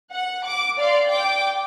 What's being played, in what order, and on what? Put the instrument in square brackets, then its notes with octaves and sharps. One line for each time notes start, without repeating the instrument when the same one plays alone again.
[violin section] F#5
D6
D5 F5 C6
G5 D6